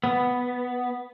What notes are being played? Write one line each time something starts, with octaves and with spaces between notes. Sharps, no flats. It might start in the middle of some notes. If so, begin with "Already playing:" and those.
B3